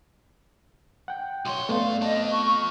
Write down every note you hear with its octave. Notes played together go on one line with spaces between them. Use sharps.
F#5 G5
B1 C#5 C6
G2 A3 B3 D5 F5
C4 D#5 A5
C#6